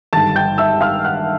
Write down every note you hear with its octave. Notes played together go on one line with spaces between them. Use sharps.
G#1 G2 D3 A5 A6
G5 G6
E5 E6
F5 F6
F#5 F#6